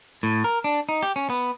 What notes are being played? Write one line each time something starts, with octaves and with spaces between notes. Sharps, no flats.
A2
A#4
D4
D#4
G4
C#4
B3